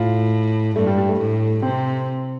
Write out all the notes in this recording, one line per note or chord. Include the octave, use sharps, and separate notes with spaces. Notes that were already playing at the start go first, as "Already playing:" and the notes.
Already playing: A2 F4
G2 A3
G3
G3
A3
A2
C3 C4